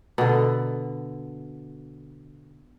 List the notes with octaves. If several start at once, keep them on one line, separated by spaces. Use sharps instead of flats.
B2 D3